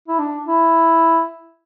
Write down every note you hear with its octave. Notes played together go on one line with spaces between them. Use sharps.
E4
D4
E4